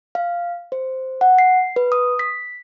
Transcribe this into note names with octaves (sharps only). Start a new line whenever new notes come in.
F5
C5
F#5
C7
B4
D#6
B6